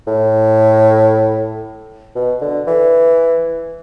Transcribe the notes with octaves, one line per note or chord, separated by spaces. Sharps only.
A2
B2
D3
E3